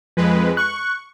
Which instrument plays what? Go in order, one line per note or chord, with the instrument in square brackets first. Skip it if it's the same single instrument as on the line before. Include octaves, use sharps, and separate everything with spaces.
[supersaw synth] F2 G#3 B4 [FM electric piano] F3
[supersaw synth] C#6 [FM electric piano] F#6